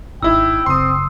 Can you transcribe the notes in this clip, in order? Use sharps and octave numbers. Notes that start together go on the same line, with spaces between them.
G#1 D#4 E4 G5 E6
F#1 C4 C6 D#6